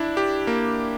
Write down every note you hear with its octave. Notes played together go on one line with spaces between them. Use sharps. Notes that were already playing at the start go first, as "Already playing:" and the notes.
Already playing: D4 E4
G4
A#3